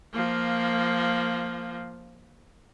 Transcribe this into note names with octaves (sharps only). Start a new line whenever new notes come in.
F3 A#3